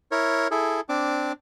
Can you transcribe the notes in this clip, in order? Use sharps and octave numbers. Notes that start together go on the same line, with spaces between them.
E4 A#4 C#5
E4 G#4 A4
C4 D4 D6